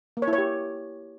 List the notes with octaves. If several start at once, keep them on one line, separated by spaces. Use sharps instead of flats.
A#3
C#5
E4
C#5
G4